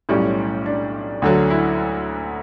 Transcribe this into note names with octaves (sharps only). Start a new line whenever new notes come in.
B1 A2 G3 C#4
D4
D2 D3 F#3
E4